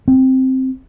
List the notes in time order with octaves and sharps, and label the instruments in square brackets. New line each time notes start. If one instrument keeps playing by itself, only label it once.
[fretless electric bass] C4